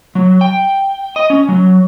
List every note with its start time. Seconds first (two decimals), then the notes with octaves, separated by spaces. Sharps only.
0.15 F#3
0.41 G5
1.16 D#5
1.30 C#4
1.49 F#3